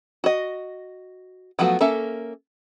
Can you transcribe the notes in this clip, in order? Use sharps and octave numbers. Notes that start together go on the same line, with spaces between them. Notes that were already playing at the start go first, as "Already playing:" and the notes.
F#4 D#5
F3 F#3 A3 B3 F#4
A#3 C#4 A4 E5